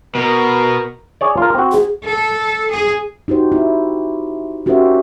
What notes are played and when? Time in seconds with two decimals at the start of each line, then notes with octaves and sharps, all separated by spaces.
0.15 B2 A#4
1.21 G#4 C#5 D5
1.37 F4 A#4
1.55 C4 F#4
1.72 G#4
2.07 A4
2.70 G#4
3.28 D#4 F#4 G4 C5
3.52 E4
4.66 C#4 F#4 G4 A#4 C5 E5